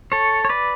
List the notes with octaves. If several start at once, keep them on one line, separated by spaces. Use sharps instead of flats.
A4 C#5
C#5
B4 D5